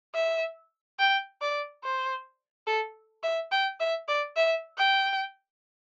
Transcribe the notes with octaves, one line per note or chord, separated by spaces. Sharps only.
E5
G5
D5
C5
A4
E5
G5
E5
D5
E5
G5